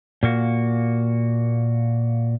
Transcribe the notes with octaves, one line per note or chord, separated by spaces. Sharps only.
A#2 A#3 F#4